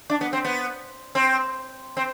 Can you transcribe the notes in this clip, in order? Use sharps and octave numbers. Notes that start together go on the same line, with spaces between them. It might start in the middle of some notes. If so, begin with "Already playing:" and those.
D4
B3
C4
B3
C4
C4